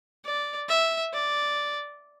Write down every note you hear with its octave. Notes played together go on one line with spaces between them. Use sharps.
D5
E5
D5